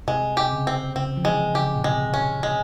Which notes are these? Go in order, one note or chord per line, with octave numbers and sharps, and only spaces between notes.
C3 G#3
C3 G4
C#3
C4
C#3 C4
F3
E3 G#3
C#3 G4
A#2
C3 G#3
C#3 C#4
C3 G#3